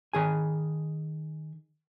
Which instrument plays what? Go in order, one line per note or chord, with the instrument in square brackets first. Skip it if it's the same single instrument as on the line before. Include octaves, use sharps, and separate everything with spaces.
[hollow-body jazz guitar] D#3 G#4 G#5